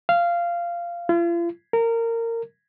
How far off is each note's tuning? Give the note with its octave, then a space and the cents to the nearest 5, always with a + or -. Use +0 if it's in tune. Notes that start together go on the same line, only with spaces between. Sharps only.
F5 -15
F4 -40
A#4 -20